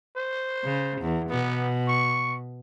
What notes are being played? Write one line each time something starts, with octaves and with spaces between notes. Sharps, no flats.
C5
C#3
E2
B2 B3
C#6